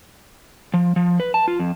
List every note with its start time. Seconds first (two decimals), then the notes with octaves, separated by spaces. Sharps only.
0.74 F3
0.96 F3
1.20 B4
1.34 A5
1.48 F4
1.59 F2